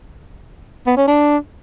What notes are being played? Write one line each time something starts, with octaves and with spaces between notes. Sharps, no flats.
B3
C#4
D4